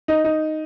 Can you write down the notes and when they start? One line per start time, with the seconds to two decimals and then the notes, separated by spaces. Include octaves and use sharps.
0.08 D#4
0.24 D#4